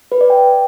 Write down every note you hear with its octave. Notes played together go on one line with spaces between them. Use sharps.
B4
D5
G5